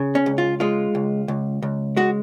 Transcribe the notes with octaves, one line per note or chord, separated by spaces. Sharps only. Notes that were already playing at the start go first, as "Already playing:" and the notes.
Already playing: C#3
C#4
C#2
F4
G#3 F4
C#2
C#2
C#2
G#3 F#4